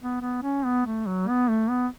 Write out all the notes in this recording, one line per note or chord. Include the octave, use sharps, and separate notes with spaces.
B3
B3
C#4
B3
A3
F#3
B3
A3
B3